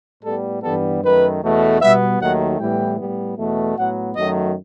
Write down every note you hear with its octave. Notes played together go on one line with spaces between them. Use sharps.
A2 G3 B3 A4
G2 E3 G3 B3 A4
F#2 D#3 A3 B4
E2 B2 A3
B2 G3 B3 E5
D#2 D#3 F#3 A3 F#5
A2 E3 G3 B3 G5
A2 G3 B3
E2 B2 A3
A2 F#3 B3 F#5
F#2 D#3 F#3 A3 D#5